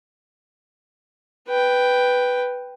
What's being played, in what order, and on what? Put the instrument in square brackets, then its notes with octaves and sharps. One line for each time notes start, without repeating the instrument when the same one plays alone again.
[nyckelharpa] B4 G5